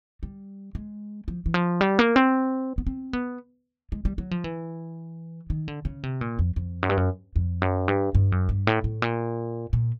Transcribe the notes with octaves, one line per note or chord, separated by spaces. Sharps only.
G3
G#3
F3
E3
F3
G3
A#3
C4
B3
C4
B3
G#3
G3
F#3
F3
E3
D#3
D3
C#3
C3
A#2
F2
F2
F#2
G2
F#2
F2
F#2
G2
G2
F#2
G2
A2
A2
A#2
A#2